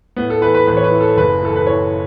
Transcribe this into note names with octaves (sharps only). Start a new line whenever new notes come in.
A2 B3
A4
E3 B4
B4
A1 B4
C#5
B4
E3
A4
F#1 B4
E3 A4
B4
E3 C#5